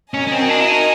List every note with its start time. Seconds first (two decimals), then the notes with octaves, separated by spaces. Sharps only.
0.14 C#4 F#4 A#4 D#5 G#5
0.27 C#4
0.32 C4
0.49 D4
0.60 E4
0.68 D#4